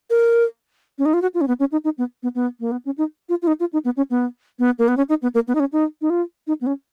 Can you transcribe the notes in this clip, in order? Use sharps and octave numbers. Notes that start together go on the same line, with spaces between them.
A#4
C#4
D#4
F4
F#4
F4
C#4
B3
C#4
D#4
D#4
B3
B3
B3
A#3
B3
C#4
D#4
F4
F4
D#4
F4
D#4
B3
C#4
B3
B3
A#3
B3
C#4
D#4
B3
A#3
B3
D#4
C#4
D#4
D#4
F4
D#4
B3
C#4